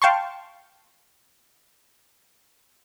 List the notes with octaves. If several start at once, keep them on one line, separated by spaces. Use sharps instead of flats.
F5 G5 A5 C6 C#6